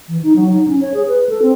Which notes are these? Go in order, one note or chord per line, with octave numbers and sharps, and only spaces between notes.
E3
D#4
F#3
D#4
C#4
C#5
G#4
B4
A4
C4